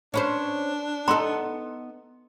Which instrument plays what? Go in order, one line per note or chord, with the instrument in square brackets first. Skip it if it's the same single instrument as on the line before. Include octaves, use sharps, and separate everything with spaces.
[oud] C#4 B4 C5 [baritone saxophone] D4
[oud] B3 D#4 A4 [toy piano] A#5 C6